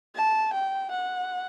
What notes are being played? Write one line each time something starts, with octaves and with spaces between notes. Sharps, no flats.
A5
G5
F#5